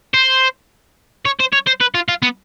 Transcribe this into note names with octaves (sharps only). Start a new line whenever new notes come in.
C5
C#5
C5
C#5
C5
B4
F4
F4
B3